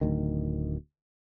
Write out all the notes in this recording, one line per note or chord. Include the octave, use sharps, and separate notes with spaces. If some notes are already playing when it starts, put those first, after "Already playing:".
D1 D2 D#3